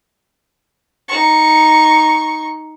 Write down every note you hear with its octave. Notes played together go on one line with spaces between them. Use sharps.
D#4 C#6